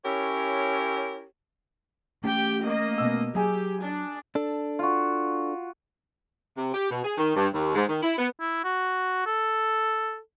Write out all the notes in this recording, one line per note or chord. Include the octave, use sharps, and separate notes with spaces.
C#4 E4 G4 A#4 C#5
A3 C#4 G4 G5
A#3 D#5
B2 E6
F#3 G4 G#4 G#5
D4
D4 A4
F4 F#4
C3
G4
B2
G#4
D#3
G2
D#2
G#2
D#3
E4
B3
E4
F#4
A4